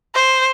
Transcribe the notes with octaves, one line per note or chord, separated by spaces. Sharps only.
C5